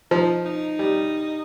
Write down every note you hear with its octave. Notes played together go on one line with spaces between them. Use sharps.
F3 D#4
D#4
G3